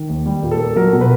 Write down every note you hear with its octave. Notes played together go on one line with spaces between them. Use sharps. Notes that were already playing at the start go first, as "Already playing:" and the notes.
Already playing: D#3
D#2
G3
A#2
A4
A#3
F#3 A#4
B2
B4